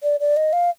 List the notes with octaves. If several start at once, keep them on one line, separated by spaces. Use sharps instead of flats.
D5
D5
D#5
F5